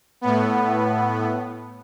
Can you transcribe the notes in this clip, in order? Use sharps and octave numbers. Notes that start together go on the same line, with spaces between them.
A2 B3